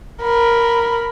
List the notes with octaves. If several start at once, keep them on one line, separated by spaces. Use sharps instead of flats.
A#4 B5